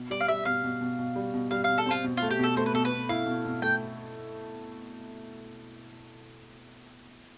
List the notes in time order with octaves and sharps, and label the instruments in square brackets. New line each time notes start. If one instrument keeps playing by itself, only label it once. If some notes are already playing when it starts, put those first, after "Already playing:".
Already playing: [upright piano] B2
[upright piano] G3 [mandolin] D5
[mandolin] F5
[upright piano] G3 [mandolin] E5
[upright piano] B2 [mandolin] F5
[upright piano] B2
B2
B2
G3
B2
[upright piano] G3 [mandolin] F5
[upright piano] B2 [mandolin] F5
[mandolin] A4
[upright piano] C4 [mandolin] F4
[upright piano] B2
[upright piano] A3 [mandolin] F4
[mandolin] G4
[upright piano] B2 [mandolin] A4
[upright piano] A3 [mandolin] C5
[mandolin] B4
[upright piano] B2 [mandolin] A4
[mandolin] B4
[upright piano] B2
[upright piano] E4 [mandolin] F5
[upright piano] B2
B2
[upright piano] A3 [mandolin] G5